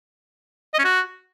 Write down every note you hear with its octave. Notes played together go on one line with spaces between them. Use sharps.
D#5
C#4
F#4